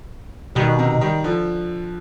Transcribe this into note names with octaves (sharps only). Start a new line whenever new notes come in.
B2 D#3 G3
C3 D#3
D#3 G3
D3 F3